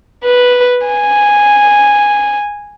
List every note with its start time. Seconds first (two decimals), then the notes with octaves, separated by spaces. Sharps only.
0.24 B4
0.87 G#5